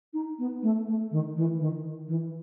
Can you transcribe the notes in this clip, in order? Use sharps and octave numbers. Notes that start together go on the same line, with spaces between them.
D#4
B3
A3
A3
D#3
E3
D#3
E3